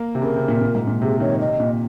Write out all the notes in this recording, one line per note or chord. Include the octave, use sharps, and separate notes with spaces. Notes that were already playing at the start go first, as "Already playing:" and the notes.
Already playing: A#3
C3
C#3 A#4
C3
A#2
A#2
G#2
A#2
C3 G#4
D#3 C#5
C3 D#5
A#2